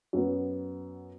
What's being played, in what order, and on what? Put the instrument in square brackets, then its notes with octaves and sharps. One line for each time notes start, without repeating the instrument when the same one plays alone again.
[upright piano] F#2 F#3 B3